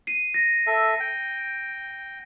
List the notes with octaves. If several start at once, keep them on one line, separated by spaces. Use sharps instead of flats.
C7 D#7
A#6
A4 E5
G5